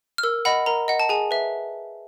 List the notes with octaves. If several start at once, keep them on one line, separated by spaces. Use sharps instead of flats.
F6
A#4 E6
D#5 F#5 B5
A#4 A#5
D#5 F#5
A5
G#4 G#5
B4 E5